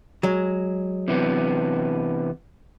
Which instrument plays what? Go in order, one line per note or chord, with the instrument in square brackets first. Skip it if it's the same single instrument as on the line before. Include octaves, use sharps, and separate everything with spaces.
[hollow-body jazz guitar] F#3 G#3
[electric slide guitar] C3 E3 B3